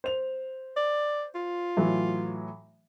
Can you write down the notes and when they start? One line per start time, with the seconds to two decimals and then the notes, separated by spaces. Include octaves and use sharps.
0.04 C5 F7
0.76 D5
1.35 F4
1.77 A2 E3 F#3